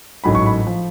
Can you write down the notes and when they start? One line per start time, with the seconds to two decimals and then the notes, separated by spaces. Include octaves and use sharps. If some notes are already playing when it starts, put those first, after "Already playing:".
0.24 A1 G#2 F#3 A3 B5
0.35 C#6
0.46 B5
0.67 F3